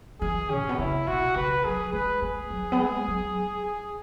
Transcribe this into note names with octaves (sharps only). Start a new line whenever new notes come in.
E3 G#4
C#4
G#2
B2
C#3 E4
B2 F#4
C#3 B4
F#3 G#4
G#3 B4
G#3 G#4
F#3
B3
G#3
F#3
G#4